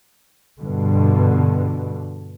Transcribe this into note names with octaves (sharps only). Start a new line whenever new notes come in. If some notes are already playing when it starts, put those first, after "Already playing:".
G2 B2 D3